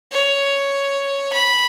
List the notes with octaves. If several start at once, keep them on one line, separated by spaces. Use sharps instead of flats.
C#5
B5